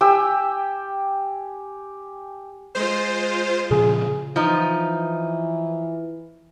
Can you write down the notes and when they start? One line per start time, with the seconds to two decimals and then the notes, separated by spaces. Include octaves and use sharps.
0.01 G4 G5 G#5 E6
2.75 G#3 F4 C5
3.71 A#2 C#3 F3 G#4
4.36 E3 F3 D#4